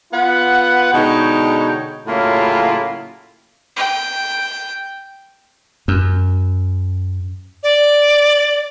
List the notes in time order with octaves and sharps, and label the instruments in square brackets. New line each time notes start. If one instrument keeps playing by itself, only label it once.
[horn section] B3 F4 B4 F#5
B2 D3 G#3 D#4 C#5 G5
A2 C#3 F#3 A#3 E4 F4
[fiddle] G5
[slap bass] F#2
[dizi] D5